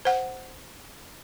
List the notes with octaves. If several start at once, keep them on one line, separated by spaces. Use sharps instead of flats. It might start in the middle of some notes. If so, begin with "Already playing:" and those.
C5 F#5